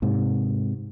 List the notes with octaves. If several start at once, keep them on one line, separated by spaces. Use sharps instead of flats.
G#2 C3